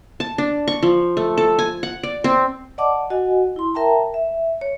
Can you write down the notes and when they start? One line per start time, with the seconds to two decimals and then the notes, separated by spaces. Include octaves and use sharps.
0.20 A5
0.38 D4
0.68 C#6
0.83 F3
1.17 A3
1.37 A4
1.59 G#5
1.83 F#5
2.03 D5
2.24 C4
2.78 D5 D#5 F#5 A5 D6
3.10 F#4 D#5 F#5 G#5
3.56 E4 C6
3.74 A#4 E5 G5 A5 A#5
4.14 E5
4.61 C#5